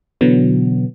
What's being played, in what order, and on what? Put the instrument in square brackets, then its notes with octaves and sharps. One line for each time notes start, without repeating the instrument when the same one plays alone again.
[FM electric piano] B2 D3 E3 F#3 B3